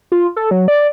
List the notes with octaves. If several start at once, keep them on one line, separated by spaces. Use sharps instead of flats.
F4
A4
F#3
D5